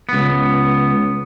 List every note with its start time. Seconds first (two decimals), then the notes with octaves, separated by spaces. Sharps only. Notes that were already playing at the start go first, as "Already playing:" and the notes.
0.09 C#2 B3